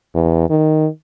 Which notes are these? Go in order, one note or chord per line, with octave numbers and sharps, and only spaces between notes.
E2
D#3